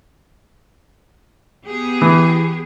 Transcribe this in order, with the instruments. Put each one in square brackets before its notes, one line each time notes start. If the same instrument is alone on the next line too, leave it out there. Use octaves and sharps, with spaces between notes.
[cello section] B3 G4 G#4
[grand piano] E3